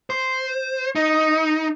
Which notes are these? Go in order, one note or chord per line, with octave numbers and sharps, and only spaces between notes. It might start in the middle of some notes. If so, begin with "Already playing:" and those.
C5
D#4